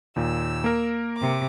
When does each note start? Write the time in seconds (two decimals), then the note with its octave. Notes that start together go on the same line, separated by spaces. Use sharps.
0.16 D#2 A#2 E6
0.64 A#3 A#4
1.17 C3 D6